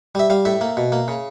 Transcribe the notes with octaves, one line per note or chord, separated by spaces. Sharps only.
G3 E5
G3 F5
A2 E5
A#3
B2
A#3
C#3